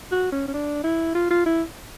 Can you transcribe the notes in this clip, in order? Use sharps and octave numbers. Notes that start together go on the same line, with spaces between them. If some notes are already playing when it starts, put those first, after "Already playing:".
F#4
C#4
C#4
D4
E4
F4
F4
E4